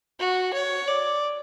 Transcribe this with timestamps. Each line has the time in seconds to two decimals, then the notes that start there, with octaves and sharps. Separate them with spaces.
0.19 F#4
0.54 C#5
0.88 D5